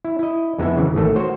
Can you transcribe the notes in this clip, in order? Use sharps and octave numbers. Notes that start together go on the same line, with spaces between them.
E4
E4 D#5
F2 G#3 B3 D#4 E4 E5
C#3 E3
A1 D#3 A3 A4
F#4 C5 C#5